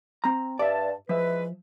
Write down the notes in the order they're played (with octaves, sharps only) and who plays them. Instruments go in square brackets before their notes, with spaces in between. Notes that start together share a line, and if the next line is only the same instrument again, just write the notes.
[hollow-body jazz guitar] C4 A#5
[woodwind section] G2 A5 [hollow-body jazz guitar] D5 E5
[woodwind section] E3 G#3 B4 [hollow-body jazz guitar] F3 E5